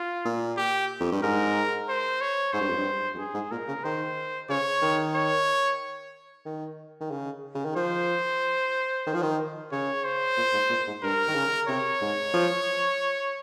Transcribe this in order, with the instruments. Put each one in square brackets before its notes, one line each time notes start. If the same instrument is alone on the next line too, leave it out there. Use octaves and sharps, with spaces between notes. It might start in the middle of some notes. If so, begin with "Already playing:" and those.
Already playing: [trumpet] F4
[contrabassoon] A#2
[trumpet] G4
[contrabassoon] F2
G2
[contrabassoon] G#2 [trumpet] A#4
[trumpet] C5
C#5
[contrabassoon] G#2 [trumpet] C5
[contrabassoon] G2
F2
G2
F2
[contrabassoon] G2 [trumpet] G#4
[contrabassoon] G#2
[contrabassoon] A#2 [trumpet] A#4
[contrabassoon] C#3
[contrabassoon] D#3 [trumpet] C5
[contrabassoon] C#3 [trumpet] C#5
[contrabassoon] D#3
[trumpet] C#5
[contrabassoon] D#3
D#3
C#3
C#3
D#3
[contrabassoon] F3 [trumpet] C5
[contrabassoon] D#3
F3
D#3
[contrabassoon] C#3 [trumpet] C#5
[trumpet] C5
[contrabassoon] A#2
G#2
A#2
G#2
[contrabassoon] G2 [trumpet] A#4
[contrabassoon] D#3
C#3
[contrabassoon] C3 [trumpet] C#5
[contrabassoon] G#2
F3